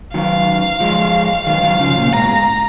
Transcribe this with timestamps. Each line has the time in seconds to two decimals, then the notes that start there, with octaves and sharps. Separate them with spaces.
0.14 D#3 F#3 F5
0.80 F3 G#3
1.46 D#3 F#3 F5
1.62 D#3 F#3
1.79 C#3 F3
1.96 A#2 C#3
2.12 G#2 B2 A#5
2.29 G#2